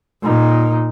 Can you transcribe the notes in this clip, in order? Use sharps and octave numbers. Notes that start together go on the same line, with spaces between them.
A#2 D#4